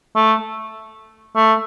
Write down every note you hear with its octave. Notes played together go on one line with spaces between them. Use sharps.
A3
A3